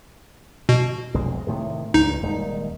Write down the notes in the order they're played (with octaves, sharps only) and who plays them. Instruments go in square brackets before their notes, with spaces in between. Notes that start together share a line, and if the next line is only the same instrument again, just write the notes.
[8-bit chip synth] B2
[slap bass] F1 B1 G#3
A2 C3 D#3
[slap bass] C#2 G2 [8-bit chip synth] D#4
[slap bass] D#1 G#3